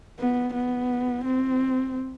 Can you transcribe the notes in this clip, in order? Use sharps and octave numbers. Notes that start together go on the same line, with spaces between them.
B3
B3
C4